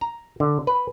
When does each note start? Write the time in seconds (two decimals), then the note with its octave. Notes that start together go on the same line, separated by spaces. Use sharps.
0.01 A#5
0.40 D3
0.67 B4